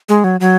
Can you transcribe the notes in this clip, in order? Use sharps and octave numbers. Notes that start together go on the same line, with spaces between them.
G#3
F#3
F#3